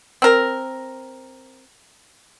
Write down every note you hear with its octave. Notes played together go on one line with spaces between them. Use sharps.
C4 A#4